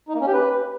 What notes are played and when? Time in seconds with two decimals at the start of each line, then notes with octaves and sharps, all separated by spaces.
0.08 D#4
0.15 A#3
0.21 C#4
0.27 G4
0.34 B4